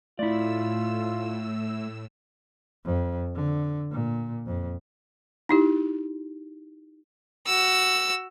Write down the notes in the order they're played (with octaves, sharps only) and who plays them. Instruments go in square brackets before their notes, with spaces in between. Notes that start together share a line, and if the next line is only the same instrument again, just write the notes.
[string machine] A2 E6 [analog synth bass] A3 [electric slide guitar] E4 D5 [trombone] F4
[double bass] F2
D3
A#2
F2
[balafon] D#4 E4 G4
[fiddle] F#4 E6